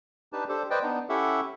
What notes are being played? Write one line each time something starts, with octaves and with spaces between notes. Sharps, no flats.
D4 D#4 G4 B4 A5
D4 G4 A4 C5
B4 C5 D5 D#5 G5
B3 D4 D#4
C#4 E4 G4 A4 E5 F#5